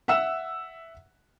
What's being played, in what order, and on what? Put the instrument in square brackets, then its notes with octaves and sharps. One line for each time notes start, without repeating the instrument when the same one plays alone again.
[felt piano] E5 F#5 E6 E7